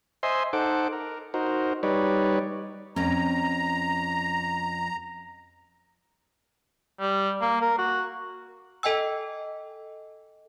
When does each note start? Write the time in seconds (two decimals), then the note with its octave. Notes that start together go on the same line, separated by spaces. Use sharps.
0.23 C5 D#5 E5 G#5 C6
0.53 D#4 A4 C5 F#5 D6
0.92 A#4
1.34 D#4 F#4 A#4 C5
1.83 G3 D#4 B4 C#5 D5
2.96 F2 C#4 A#5
7.00 G3
7.41 A#3
7.61 A#4
7.78 F#4
8.83 A4 D#5 G5 G#5 E6